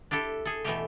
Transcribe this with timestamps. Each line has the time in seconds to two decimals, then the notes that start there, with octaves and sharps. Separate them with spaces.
0.11 D4 E4 G4 A4
0.45 G#4 A4
0.65 B2 E3 A3 G4